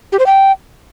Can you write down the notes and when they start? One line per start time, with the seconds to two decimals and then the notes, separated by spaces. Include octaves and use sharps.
0.12 G4
0.19 C5
0.26 G5